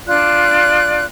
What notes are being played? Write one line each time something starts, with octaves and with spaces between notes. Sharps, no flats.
D4 F4 D5 F#6